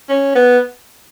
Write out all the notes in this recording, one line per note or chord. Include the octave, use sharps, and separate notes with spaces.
C#4
B3